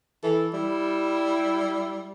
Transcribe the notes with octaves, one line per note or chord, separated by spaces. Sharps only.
E3 A4
G3 E4